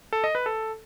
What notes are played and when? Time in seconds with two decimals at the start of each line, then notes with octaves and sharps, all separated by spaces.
0.13 A4
0.24 D#5
0.35 B4
0.46 A4